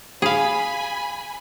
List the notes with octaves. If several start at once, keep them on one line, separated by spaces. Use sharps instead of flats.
G#4 F5 G#5 B5